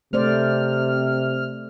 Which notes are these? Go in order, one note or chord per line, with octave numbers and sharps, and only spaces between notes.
C3 A3 C5 D5 F6